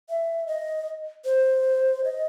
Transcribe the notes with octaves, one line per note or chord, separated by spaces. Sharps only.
E5
D#5
C5
D#5